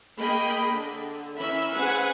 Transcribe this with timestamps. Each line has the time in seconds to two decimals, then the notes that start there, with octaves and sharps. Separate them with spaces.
0.18 A#3 G#4 D#5 G5 B5
0.70 D3
1.37 E3 C#4 A#4 E5 B5
1.73 C4 C#4 G#4 B4 F#5 G#5